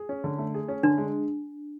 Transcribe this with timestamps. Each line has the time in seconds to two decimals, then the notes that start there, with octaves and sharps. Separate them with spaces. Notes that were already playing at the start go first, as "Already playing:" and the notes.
Already playing: G#4
0.09 C#4
0.24 D3
0.38 A3
0.54 G#4
0.68 C#4
0.83 D3 D4
0.98 G#3